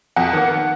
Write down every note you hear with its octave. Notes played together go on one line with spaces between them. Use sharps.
F2 F#5
D#3 A#3